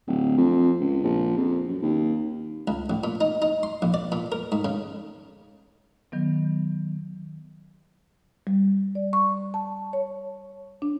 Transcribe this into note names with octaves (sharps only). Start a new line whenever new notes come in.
D1
F2
C#2
A#1
F2
F#2
D#2
C#2
A1
A#2
D#4
D#4
C6
A#1
D5
A#2
A#4
G#2
C#3
D#3 F#3 B3
G3
D5
C#6
A5
C#5
D4